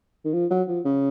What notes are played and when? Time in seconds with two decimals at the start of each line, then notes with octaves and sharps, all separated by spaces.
0.24 D#3
0.34 F3
0.50 F#3
0.68 F3
0.85 C#3